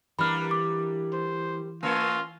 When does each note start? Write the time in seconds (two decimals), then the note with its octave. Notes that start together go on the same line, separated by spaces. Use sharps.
0.19 E3 G3 A#3 D4 B5 F6
0.51 D6
1.13 C5
1.83 A3 A#3 F4 C#5